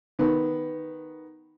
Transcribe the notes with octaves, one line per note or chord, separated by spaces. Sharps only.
D#3 B3